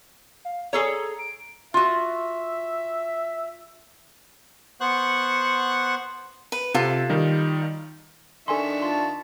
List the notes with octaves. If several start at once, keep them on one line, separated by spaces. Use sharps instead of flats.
F5
G#4 A4 C#5 A#5
D7
F4 F#4 E5
B3 C5 F#5 C#6 F#6
B4
C3 F4 A4
D#3 G3 D#4
D#3 D4 A4 E5 G#5 C6 C#6
F4 A5 C6